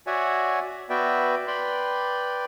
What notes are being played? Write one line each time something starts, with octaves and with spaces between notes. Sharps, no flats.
F#4 C#5 D5 E5 F#5 G#5
B3 F#4 B4 D5 E5 G5
B4 D5 G5 B5 C6